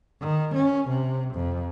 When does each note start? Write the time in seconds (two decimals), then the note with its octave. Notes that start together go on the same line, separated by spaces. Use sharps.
0.21 D#3
0.55 C#4
0.89 C3
1.35 F2